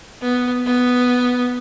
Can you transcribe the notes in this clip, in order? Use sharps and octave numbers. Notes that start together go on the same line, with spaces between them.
B3
B3